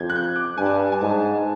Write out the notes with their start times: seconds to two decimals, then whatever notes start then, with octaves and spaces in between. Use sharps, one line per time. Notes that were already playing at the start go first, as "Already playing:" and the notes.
Already playing: F2 G6 G#6
0.10 F#6
0.15 G6
0.36 D6
0.57 G2 G#5
0.66 A5
0.74 G#5
0.92 G#5
1.01 G#2 A5